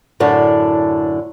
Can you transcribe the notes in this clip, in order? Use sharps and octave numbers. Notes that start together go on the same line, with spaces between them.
F#2 A2 D3 D4